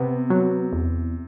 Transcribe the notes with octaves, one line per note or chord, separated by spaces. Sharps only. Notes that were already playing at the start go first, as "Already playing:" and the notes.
Already playing: C3 B3
F#3
E2